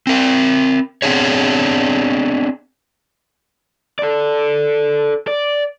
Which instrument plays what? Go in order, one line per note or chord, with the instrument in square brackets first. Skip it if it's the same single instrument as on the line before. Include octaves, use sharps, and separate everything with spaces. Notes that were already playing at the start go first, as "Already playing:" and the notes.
[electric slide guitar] C4 A#4
B3 C4 D4 G#4 C#5
[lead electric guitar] A4 D5
D5